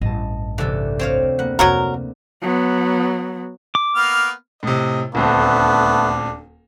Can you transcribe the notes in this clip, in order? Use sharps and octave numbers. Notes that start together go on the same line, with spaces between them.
A1 G2 D#5 A5
D2 C3 E3 A4
C4 C#5 F5 G5
F2
A#3 B3 F#5
F2 C3 F#3 F#4 A#4
F#3 B3
D6
A#3 B3 F6
A2 C3 D#5
D#1 D2 A3 B3 C4 D4